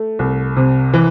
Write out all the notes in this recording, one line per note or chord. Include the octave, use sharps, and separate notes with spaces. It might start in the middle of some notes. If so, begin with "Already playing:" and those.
Already playing: A3
C2
C3
E3